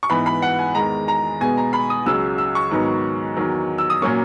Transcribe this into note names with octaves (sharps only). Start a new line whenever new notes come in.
C#6
G#2 E3 B3 B5
B5
F#5
G#5
E2 D#3 G#3 A#5
A#5
B2 G#3 B3 G#5
A#5
B5
D#6
C#2 C#3 F#3 E6
E6
C#6
G#2 D#3 F#3 B3
E2 D#3 F#3
E6
D#6
A#2 F#3 A#3 C#4 C#6